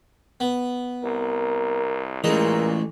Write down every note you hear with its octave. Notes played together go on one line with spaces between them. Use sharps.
B3
C2 A#4
A#2 E3 G#3 A3 A#4 D#5